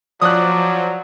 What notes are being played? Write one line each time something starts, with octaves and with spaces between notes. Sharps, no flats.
F3 F#3 D5 D#6 F#6